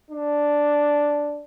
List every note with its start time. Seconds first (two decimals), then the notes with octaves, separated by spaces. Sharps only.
0.10 D4